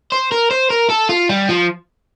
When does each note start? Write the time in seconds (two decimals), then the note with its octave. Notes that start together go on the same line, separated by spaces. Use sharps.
0.12 C5
0.32 A#4
0.51 C5
0.70 A#4
0.90 A4
1.09 F4
1.29 G3
1.49 F3